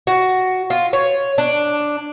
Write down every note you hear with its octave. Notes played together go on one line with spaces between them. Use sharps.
F#4
F4
C#5
D4